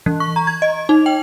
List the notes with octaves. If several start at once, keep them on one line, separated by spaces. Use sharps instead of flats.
E3
C#6
A#5
G#6
D#5
D#4
G5